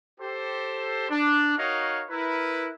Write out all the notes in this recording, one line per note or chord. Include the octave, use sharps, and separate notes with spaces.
G4 A4 C5
D4
D#4 F#4 A#4 C#5 D#5 F5
E4 A#4 B4